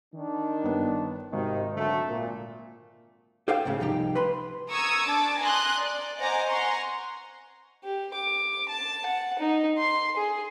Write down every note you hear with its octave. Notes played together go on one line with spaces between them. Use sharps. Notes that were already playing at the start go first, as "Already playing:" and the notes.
D#3 D4
G1 B3
G#1 C3 D#3 D#4
D3 F#3 A3
A#2
G4 A4 C5 E5 F5 G5
C#2 G#2 C#3 A3
C2 F3 D#4 G4
B4 B5 C6
A#5 C#6 D#6 E6 G#6
D4 A5 D6
G#5 A#5 C6 D#6 F#6
D5
C5 D#5 F#5 G#5 A#5 D6
F#5 G#5 A#5 C6 C#6
G4
D6
A5
F#5
D#4
C6
G#4